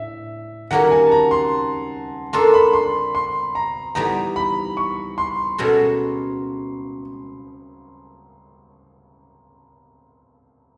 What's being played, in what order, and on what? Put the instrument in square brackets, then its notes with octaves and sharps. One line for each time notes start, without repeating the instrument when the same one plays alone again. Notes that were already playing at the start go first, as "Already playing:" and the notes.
Already playing: [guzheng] A2 D4 [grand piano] E5
[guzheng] D#3 G3 A#3 C#4 F#4 [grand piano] F#5
[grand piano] G#5
A5
A#5
C6
[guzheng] A#3 D4 F4 A4 [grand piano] C6
[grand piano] B5
C6
C6
A#5
[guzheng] E3 G3 B3 D#4 [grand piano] A#5
[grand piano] B5
C#6
C6
[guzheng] B2 G#3 C#4 F#4 A4